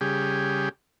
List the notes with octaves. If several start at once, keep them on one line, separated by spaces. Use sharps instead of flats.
C#3 G3 G4 G#4